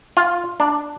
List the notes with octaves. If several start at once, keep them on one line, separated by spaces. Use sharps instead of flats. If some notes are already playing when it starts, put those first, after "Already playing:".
F4
D4